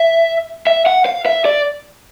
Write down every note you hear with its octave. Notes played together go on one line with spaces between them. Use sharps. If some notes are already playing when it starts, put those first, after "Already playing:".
Already playing: E5
E5
F#5
F5
E5
D5